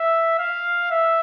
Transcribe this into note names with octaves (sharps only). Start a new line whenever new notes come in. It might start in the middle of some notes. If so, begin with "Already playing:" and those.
Already playing: E5
F5
E5